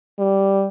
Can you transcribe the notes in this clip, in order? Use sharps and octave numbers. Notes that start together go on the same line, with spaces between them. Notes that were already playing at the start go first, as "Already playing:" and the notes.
G3